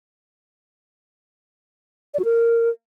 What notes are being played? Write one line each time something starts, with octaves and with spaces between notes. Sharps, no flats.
D5
F#4
A#4